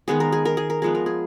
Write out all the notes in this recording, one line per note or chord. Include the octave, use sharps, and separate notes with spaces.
D#3 G#3 B3 G#4
A#4
G#4
A#4
G#4
A#4
F3 G#3 B3 G#4
A#4
G#4